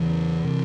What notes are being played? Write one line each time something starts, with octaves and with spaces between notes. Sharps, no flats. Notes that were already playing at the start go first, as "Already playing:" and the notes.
Already playing: E2 C#3 E3
C3